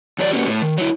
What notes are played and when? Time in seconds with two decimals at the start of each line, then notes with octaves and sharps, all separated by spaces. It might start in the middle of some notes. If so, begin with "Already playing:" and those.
0.18 E2 F#3 D4 D5
0.31 A#3 B3 C#4 F#4 G4
0.47 A2
0.62 D#3
0.77 F#3 E4